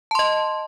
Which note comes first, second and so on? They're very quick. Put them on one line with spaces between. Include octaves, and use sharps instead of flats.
A5 C6 D#5